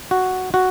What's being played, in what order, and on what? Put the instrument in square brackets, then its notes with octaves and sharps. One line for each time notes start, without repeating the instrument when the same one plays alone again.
[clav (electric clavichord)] F#4
F#4